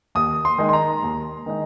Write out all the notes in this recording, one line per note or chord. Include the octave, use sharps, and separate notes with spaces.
D#2 D#6
C6
D#3 G#3 D#4
C6
A#5
D#2
D#3 G#3 D#4